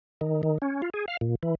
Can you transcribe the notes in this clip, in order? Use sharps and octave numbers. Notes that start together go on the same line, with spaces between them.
D#3
D#3
C#4
F4
G#4
F5
A#2
E3